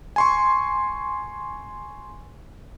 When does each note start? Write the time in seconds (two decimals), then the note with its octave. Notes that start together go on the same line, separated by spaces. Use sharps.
0.16 G#5 C6 C#6